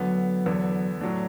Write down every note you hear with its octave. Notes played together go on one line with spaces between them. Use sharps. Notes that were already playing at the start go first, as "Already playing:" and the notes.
Already playing: D2 D3 F#3 B3
E2 D3 B3
A2 F#3 A3 D4